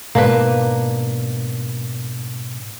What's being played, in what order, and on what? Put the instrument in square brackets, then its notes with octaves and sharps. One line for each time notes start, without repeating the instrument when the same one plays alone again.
[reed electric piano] G#2 B2 [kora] A#3 D4 B4